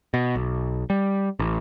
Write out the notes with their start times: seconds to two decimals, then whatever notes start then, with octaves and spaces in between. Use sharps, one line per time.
0.14 B2
0.36 B1
0.90 G3
1.39 A1